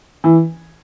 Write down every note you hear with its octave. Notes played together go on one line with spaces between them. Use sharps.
E3